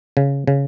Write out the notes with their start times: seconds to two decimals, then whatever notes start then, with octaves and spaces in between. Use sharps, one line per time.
0.17 C#3
0.47 C#3